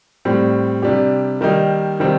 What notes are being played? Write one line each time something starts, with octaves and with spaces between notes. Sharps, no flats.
A2 G3 C4
C3 G3 D4 G4
D#3 G3 A#3 D#4
C3 D#3 G3 C4